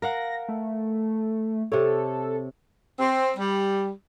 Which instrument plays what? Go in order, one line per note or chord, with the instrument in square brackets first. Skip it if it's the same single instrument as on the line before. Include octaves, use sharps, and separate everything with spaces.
[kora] A#4 F5 F#5 [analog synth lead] A#6
[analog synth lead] A3
[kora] C3 C#5 [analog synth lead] A4
[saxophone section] C4
G3